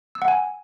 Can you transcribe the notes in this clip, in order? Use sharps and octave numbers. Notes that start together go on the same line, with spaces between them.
E6
F#5
G#5